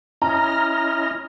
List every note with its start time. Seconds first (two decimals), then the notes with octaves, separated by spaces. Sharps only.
0.22 C#4 E4 D#5 A#5 F6 A#6